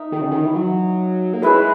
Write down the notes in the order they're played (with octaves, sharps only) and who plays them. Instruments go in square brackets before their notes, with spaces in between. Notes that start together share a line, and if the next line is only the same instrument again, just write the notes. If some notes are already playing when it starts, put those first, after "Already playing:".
Already playing: [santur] D#4 A#4 E5
[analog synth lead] D#3
C#3
D#3
E3
F#3
A#3
[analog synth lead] G#3 [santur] C#4 E4 B4 E5